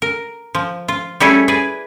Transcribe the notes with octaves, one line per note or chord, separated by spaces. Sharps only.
A#4
F3
F4
G3 A3 C#4 E4 G#4 A4
G#4 B4 D5